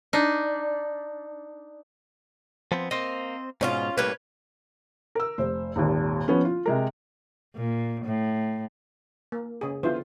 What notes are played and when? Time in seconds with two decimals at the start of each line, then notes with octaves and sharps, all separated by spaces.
0.13 D4 D#4
2.72 F3 B3 C4
2.91 A#3 C4 C5 D#5
3.61 G#2 B2 C#4 D#4 F4
3.98 A2 G3 A#3 C#4 B4
5.15 A#4 E6
5.38 F1 C5
5.76 D#1 G#1 D#2
6.28 F3 B3 C#4
6.45 F4
6.66 C3 G#3 A#4
7.56 A#2
8.05 A2
9.32 A#3
9.61 C#3 G#4
9.83 D3 F3 B3 E4 F4 C5